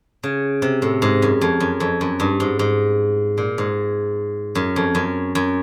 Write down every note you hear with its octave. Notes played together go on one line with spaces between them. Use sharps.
C#3
C3
A2
G#2
F#2
F2
F#2
F2
F#2
G2
G#2
G#2
A#2
G#2
F#2
F2
F#2
F#2